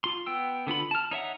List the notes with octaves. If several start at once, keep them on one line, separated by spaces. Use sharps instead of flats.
F4 C6
B3 G5 E6
D3 B3 F4 B5
A5 F6
D#4 C#5 E5 F#5